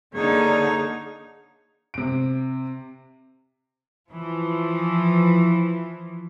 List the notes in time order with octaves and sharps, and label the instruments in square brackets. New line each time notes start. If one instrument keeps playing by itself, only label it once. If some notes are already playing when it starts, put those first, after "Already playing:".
[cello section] D3 [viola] A#3 D#4 [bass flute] G#4 [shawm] C#5
[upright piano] C3 D7
[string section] E3 F3